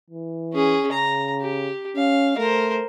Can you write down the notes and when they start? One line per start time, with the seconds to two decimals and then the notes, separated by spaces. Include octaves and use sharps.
0.10 E3
0.53 C#4 G#4
0.92 C#3 A#5
1.40 G4
1.96 C#4 F5
2.38 A3 A#4 C5